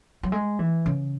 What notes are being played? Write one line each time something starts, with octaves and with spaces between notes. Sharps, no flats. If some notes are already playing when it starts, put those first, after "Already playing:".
F#3
G#3
E3
C#3